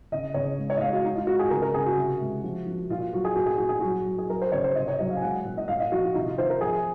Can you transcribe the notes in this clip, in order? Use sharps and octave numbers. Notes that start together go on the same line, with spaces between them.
C#3 D#5
C#3 C#5
G#3
C#5
D#5
G#3 F5
F#4
G#3 D#4
F4
G#3 F#4
G#4
C#3 A#4
A#4
C#3 G#4
F#4
C3
G#3
F3
F3
A#2 F4
F#3 F#4
G#4
A#2 F#4
G#4
A#2 F#4
G#4
F#3 F#4
F#3
G#4
F#3 A#4
C5
C#3 C#5
C5
C3 D#5
C#5
F#3 D#5
F5
G#5
G#3 F#5
A#2
D#5
A#2 F5
D#5
F3 F#4
F4
C3 D#4
F4
D#3 C5
A#4
F3 G#4